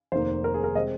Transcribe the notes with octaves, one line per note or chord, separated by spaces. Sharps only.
F1 D#2 D#3 A#3 C5
A#4
G#4
A#4
C3 G#3 C4 D#5